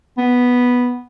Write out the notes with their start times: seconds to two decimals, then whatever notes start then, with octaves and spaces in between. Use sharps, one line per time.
0.18 B3